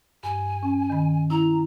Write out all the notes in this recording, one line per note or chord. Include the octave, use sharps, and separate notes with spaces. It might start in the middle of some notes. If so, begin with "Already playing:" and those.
G2 G#5
C#4
D#3 B5
E4 A#5